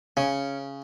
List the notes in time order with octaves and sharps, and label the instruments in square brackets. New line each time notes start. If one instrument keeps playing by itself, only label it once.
[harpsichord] C#3 [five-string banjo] C#4